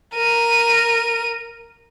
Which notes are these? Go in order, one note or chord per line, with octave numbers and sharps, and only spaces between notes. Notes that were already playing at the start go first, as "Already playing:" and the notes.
A#4 D#7